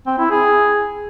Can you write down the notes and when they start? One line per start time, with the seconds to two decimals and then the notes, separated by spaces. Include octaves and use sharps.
0.07 C4
0.18 E4
0.30 G#4